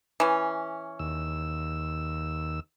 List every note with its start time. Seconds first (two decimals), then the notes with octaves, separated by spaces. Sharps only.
0.20 E3 C#4
0.99 D#2 E6